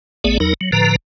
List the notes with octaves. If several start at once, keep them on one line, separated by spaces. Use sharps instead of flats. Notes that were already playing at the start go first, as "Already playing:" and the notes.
A1 A3 B3 G#4 D5
E2 F#3 D#4 A#4
F#3
A2 D3 F3 B4 A#5